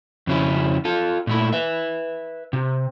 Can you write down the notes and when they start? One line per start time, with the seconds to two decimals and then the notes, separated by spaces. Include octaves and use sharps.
0.27 F2 C#3 C#4 E4
0.85 F4 A4
1.27 A#2 A3 E4
1.53 B4 E5
2.53 C3